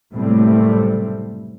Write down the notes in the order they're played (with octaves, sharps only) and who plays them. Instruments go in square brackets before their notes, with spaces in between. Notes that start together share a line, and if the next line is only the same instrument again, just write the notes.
[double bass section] F#1 A2 C3 G3 A3 C4